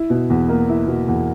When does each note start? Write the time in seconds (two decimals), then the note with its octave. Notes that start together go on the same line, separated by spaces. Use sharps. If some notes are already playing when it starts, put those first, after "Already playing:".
Already playing: E4
0.10 B2
0.30 E2
0.48 A#3
0.69 E4
0.87 B2
1.08 E2